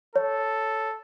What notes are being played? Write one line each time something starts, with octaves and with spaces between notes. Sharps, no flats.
A4 C#5